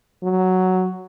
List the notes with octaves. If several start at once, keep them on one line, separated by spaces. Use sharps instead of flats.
F#3